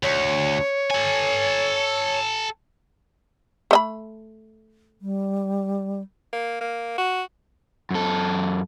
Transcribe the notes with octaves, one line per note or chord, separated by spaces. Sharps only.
D2 C#5
A4 G#5
A3 D#5 B5
G3
A#3
A#3
F#4
F#2 A4